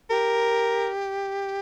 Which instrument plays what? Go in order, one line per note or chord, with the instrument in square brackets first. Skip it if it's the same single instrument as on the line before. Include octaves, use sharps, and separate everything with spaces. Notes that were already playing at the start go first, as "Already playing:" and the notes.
[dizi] G4 [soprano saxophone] A#4